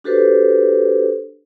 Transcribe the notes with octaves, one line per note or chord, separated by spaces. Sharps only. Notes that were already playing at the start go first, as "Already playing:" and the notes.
D4 F#4 G4 A4 B4 C5